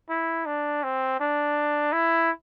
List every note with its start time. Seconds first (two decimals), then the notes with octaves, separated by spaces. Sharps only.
0.09 E4
0.46 D4
0.83 C4
1.20 D4
1.92 E4